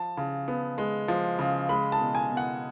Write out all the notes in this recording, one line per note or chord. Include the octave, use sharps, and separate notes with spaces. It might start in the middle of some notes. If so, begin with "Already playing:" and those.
Already playing: F3 A5
C#3
B3
G#3
F3
C#3
G#3 B5
A5
B2
G#5
B2
F#5